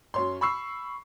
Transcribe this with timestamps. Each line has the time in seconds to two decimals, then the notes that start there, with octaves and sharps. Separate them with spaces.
0.14 F#2 C#5 C6
0.41 B5 C#6 E6 C7